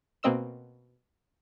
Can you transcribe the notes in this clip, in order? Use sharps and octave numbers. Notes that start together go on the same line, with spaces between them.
B2 A#3 C4 D#5 E6 E7